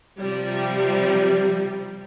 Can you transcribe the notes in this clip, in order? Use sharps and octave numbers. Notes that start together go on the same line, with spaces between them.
C3 F3 G3